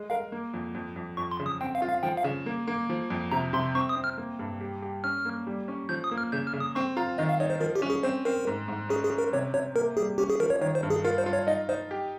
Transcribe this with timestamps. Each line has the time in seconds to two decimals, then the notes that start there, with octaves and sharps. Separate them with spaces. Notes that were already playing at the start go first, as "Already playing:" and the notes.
Already playing: G#3
0.10 A#4 F5
0.32 A#3
0.54 F2
0.75 F2
0.96 F2
1.17 F2 C#6
1.31 C6
1.40 C#3
1.46 D#6
1.61 C4 G5
1.75 F5
1.82 F4
1.89 F5
2.03 F3 G5
2.17 F5
2.24 C#3
2.46 A#3
2.67 A#3
2.89 F3
3.10 F2
3.32 C3 A#5
3.53 C3 C6
3.75 C4 C#6
3.89 D#6
3.96 C4
4.04 F6
4.18 A#3
4.39 G2
4.61 G4
4.82 G4
5.04 C#4 F6
5.25 A#3
5.47 G3
5.68 C#4
5.89 F3 G6
6.04 D#6
6.11 A#3
6.18 F6
6.32 C#3 G6
6.47 F6
6.53 C#3
6.60 D#6
6.75 C4 C#6
6.97 F4 A#5
7.18 D#3 D#5
7.29 F5
7.40 D#4 C#5
7.50 C5
7.61 F3 A#4
7.75 G4
7.82 C#4
7.90 G#4
8.03 C4 C5
8.25 C4 A#4
8.47 G#2
8.68 G#2
8.89 C#4 G#4
9.04 G#4
9.11 C#4
9.18 A#4
9.33 C3 C#5
9.54 C3 C#5
9.76 A#3 A#4
9.97 G3 G#4
10.18 C#4 G4
10.30 G#4
10.40 F3 A#4
10.50 C#5
10.61 D#3 C#5
10.75 C5
10.83 G2
10.90 G#4
11.04 F4 A#4
11.18 C5
11.26 F4
11.33 C#5
11.47 D#4 D#5
11.69 D#4 C5
11.91 G4